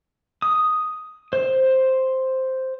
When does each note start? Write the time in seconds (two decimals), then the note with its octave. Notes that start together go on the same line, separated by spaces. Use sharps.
0.42 D#6
1.33 C5